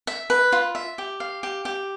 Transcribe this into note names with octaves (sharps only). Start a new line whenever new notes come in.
E5
B4
F4
E5
G4
F5
G4
G4